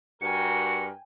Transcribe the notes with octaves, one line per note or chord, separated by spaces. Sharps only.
G2 F#4 A#4 G5 G#5 C#7